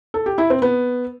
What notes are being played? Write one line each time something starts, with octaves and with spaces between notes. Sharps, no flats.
A4
G4
E4
C4
B3